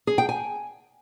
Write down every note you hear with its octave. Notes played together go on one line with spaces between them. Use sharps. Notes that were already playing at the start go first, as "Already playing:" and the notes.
G#4
G5
G#5